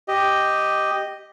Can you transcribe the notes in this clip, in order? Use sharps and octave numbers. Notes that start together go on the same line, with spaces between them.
G4 D#5